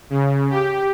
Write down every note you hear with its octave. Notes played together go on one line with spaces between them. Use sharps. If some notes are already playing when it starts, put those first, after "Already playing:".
C#3
G4